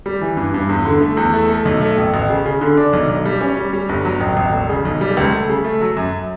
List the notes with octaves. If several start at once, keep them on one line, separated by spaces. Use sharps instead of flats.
G3
E3
G2
G2
E2
D3
A3
E2
A3
A3
B1
A3
A1
A1
C#3
C#3
D3
D4
B1
B1
G3
C#4
G3
G3
G1
F#3
A1
A1
E1
C#3
B1
G3
C#2
A3
C#3
A3
F#3
F#2